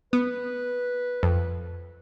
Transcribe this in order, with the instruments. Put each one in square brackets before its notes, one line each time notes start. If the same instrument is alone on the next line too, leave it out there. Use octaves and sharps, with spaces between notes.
[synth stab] B3 [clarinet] B4
[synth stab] F2